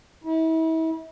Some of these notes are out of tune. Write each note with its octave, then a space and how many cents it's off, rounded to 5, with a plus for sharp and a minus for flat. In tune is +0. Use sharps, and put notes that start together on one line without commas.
E4 -35